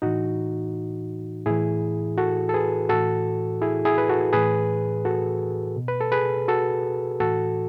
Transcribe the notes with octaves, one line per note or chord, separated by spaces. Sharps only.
A2 E3 D#4 F#4
A2 E3 E4 G#4
F#4 A4
A4
G#4 B4
A2 E3 F#4 A4
E4 G#4
E4 G#4
B4
F#4 A4
A2 E3 G#4 B4
F#4 A4
B2
B4
A4
G#4 B4
F#4 A4
A2 E3 F#4 A4